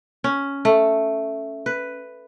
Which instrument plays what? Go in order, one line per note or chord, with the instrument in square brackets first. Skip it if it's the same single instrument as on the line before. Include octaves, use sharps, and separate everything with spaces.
[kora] C#4
A3
B4